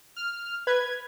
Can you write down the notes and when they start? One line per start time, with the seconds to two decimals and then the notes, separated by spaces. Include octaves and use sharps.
0.16 F6
0.67 B4 G#6